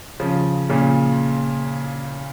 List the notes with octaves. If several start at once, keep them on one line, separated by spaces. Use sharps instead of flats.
C#3 F3
A#2 C#3